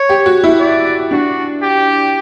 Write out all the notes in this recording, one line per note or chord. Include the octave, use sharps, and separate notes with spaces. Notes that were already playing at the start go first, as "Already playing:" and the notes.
Already playing: C#5
G4
F#4
E4
D5
D4 F#4
G4